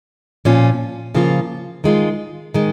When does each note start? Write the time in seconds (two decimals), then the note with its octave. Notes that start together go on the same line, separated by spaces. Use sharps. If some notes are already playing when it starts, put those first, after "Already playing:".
0.45 A#2 F3 C#4 F4
1.15 C#3 F3 A#3 F4
1.84 D#3 G#3 F4
2.54 D#3 G#3